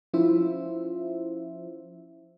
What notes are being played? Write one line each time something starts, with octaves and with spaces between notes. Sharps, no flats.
F3 C#4 E4 F4 C5 E5